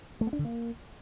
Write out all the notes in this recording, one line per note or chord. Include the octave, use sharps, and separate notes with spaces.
A3
B3
D4
D3
A#3